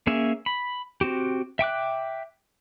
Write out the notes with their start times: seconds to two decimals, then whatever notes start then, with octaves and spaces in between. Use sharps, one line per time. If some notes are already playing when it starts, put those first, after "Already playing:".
0.07 A#3 C#4 G#4 E5
0.46 B5
1.01 C4 F#4 G4
1.59 E5 G5 D6 F#6